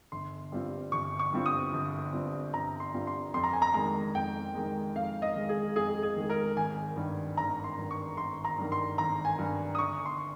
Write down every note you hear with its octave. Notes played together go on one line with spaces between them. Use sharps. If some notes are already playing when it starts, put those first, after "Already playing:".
G1 C6
G2 G3 C4 F4
G1 C#6
C#6
G2 G3 C4 F4
D#6
G1
G2 G3 C4 F4
G1 A#5
C6
G2 G3 C4 F4
C6
F2 C6
A#5
G#5
A#5
D#3 G#3 A#5
F2 G5
D#3 G#3
F2 F5
D#5
D#3 G#3
G#4
F2 G#4
G#4
D#3 G#3
A#4
G#1 G#5
G2 D#3
G#1 A#5
C6
G2 D#3
C#6
G#1 C6
A#5
G2 D#3
C6
G#1 A#5
G#5
G2 D#3
D#6
G1 C#6
C6